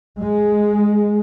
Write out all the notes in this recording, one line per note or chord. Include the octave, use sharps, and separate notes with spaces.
G#3